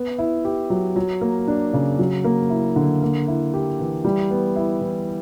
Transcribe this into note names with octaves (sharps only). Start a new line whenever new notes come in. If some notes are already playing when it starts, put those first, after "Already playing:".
Already playing: B3
E4
G4
F#3
F#3
A#3
D4
C#3
F#3
A#3
E4
D3
A#3
E4
G4
E3
G3
B3
E4
E3